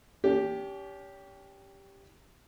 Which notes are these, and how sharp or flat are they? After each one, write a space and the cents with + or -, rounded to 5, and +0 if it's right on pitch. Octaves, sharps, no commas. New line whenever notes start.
C#4 +40 G4 +0